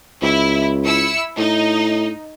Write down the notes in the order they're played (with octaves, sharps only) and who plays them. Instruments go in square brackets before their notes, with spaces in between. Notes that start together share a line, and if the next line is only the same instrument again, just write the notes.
[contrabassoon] C#2 [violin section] E4
[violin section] E4 E6 C#7
[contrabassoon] A2 [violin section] D#4